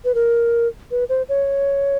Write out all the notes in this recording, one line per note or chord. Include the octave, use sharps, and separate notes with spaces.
B4
A#4
B4
C5
C#5